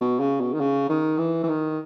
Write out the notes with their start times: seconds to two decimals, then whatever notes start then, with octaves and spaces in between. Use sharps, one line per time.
0.01 B2
0.20 C#3
0.40 B2
0.54 D#3
0.60 C#3
0.89 D#3
1.18 E3
1.43 E3
1.49 D#3